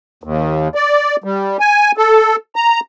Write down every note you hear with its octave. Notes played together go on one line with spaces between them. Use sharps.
D#2
D5
G3
G#5
A4
A#5